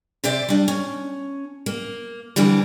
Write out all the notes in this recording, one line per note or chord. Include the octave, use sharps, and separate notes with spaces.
C3 C5 D5 E5
G3 D4
C#4
A#3
F2 D3 E3 G3